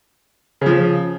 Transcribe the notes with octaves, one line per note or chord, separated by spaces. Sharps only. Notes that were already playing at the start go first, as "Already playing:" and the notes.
C#3 F3